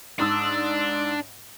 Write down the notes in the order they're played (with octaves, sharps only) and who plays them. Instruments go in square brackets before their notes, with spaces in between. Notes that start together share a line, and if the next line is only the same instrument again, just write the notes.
[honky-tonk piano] G#2 D#6 E6 [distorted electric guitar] D4